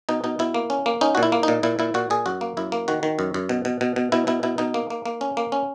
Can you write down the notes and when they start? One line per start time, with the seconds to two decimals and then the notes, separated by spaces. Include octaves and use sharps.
0.09 B2 D#4
0.24 B2 D#4
0.39 B2 E4
0.54 A#3
0.70 C#4
0.86 A#3
1.01 C#4 D#4
1.15 F#4
1.17 A#2
1.23 E4
1.32 A#3
1.43 A#2 D#4
1.63 A#2 E4
1.79 A#2 E4
1.94 A#2 F#4
2.10 A#2 G#4
2.26 F#2 F#4
2.41 A#3
2.57 F#2 E4
2.72 A#3
2.88 D#3 F#4
3.03 D#3
3.19 F#2
3.34 F#2
3.49 B2
3.65 B2
3.81 B2
3.96 B2
4.12 B2 E4
4.27 B2 E4
4.43 B2 E4
4.58 B2 D#4
4.74 A#3
4.90 A#3
5.06 A#3
5.21 C#4
5.37 A#3
5.52 C#4